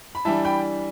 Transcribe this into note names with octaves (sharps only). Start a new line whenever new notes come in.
B5
E3 G3 D4 E5 A5
G5 B5